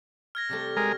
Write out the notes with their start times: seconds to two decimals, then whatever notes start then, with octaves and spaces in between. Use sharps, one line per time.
0.35 F6 G#6 A#6
0.49 C3 G3 A3
0.77 G#3 A#4